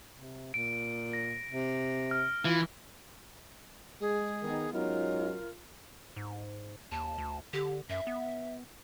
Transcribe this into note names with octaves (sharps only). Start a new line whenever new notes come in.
C3
A#2 D7
A#6
C3
F6
E3 F4
G#3 G#4
D#3 B3 D#4
G#2 F#3 C#4 D#4 F4 A#4
G#2
D#2 A5
D2
D3 G4
F#2 E5
B3